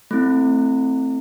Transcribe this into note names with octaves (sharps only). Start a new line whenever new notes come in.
A3 C4 E4